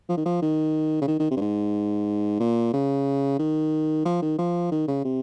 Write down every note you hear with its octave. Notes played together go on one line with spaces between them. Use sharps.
F3
D#3
F3
D#3
C#3
D#3
D#3
C3
G2
G#2
A#2
C#3
D#3
F3
D#3
F3
D#3
C#3
C3